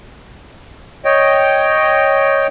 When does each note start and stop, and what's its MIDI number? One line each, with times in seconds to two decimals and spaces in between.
1.05 2.47 73
1.05 2.47 75
1.05 2.47 79